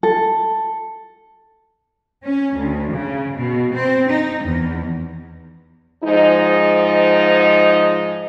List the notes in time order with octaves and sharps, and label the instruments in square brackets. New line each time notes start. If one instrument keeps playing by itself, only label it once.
[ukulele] A4
[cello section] C#4
D2
C#3
B2
C4
D#4
E2
[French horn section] G#2 F3 D#4